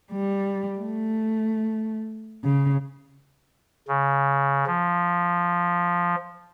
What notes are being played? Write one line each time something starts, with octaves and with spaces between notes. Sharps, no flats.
G3
A3
C#3
C#3
F3